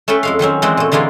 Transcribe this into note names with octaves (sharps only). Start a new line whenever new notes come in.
A3 C#4 A4 B4 G5
F2 G#3 F5
D#3 F#3 C4 C#4
E3 G#3 C4 F#4 D5
A#2 A3
D3 E3 G#3 A#3 F4